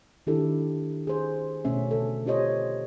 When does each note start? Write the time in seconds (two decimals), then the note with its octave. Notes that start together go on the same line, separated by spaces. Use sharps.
0.27 D#3 D4 E4 G4 A4
1.07 G#4 C5
1.65 B2 A3 C#4 E5
1.91 D3 A4
2.25 C#4 F4 G4 C5 C#5 D#5